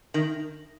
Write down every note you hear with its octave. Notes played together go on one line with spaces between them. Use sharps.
D#3